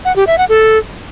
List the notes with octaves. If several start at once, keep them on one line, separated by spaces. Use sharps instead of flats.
F#5
G4
E5
F#5
A4